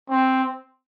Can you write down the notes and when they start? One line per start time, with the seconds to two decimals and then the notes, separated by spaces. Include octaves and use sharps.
0.09 C4